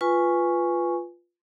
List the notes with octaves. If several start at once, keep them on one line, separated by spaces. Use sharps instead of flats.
F4 B4 G#5 C#6